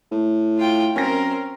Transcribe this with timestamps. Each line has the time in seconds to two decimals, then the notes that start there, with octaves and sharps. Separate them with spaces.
0.11 A2
0.58 F4 G5
0.96 F#2 C4 C#4 A#4 A#6